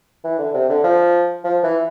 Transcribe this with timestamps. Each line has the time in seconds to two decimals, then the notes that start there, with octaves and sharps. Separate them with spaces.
0.24 E3
0.39 D3
0.54 C3
0.69 D3
0.84 F3
1.44 F3
1.63 E3